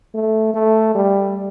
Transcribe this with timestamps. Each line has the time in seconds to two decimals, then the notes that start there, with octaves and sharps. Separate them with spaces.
0.14 A3
0.54 A3
0.95 G3